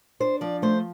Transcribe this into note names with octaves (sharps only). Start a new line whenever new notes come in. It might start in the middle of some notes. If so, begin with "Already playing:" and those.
D4 C5
F3 D5
A3 C5